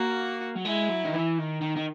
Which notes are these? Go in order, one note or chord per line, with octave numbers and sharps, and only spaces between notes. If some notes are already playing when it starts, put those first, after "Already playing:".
Already playing: A#3 F#4
F#3
G#3 E4
F#3
D#3
E3
D#3
D#3
D#3